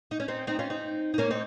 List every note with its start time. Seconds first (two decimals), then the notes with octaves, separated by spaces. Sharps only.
0.11 D#4
0.20 C#4
0.28 C4 D#4
0.47 C4 D#4
0.59 C#4 F4
0.70 C4 D#4
1.14 D#4
1.18 A#3 C#4
1.30 C4 D#4